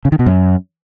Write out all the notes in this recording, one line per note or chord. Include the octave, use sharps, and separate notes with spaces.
C#3
D#3
B2
F#2